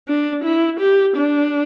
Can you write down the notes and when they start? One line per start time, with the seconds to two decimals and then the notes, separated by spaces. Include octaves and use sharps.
0.08 D4
0.44 E4
0.80 G4
1.16 D4